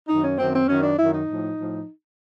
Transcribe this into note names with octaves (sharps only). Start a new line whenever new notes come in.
F#2 D#3 D#4
C#4
F#2 D#3 C4
C4
F#2 D#3 C#4
D4
F#2 D#3 E4
D#4
A2 F3
A2 F3